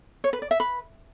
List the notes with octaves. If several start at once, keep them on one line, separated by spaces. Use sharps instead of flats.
C#5
B4
D5
E5
B4